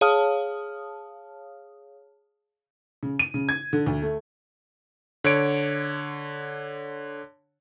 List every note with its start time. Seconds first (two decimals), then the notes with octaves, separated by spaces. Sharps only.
0.01 G#4 C#5 F5 A5 D#6 F6
3.03 C#3
3.19 D#7
3.34 C#3
3.49 G#6
3.73 D3
3.86 D2
4.02 A3
5.24 D3 C#5 D7